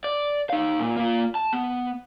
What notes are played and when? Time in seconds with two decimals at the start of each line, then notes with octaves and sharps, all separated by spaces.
0.04 D5
0.50 D#4 F5
0.80 A#2
0.97 A#3 F4
1.35 A5
1.53 B3